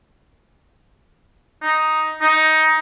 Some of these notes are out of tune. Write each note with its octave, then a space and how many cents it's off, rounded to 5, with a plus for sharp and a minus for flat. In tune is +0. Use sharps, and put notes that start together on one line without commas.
D#4 +5
D#4 +15